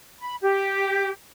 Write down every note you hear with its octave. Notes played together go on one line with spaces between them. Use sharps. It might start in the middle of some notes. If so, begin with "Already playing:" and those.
B5
G4